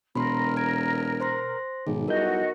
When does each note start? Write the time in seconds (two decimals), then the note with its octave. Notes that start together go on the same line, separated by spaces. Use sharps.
0.15 E1 B2 A#4 B5 C6
0.57 A#5 G#6 D7
1.20 C5 C6 A#6
1.87 B1 G#2 B2 D#3 G#4
2.08 G3 E4 F#4 A#4 D#5 G6